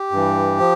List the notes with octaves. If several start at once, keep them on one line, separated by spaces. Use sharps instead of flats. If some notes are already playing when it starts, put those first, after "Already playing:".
Already playing: G4
G2 E3
F3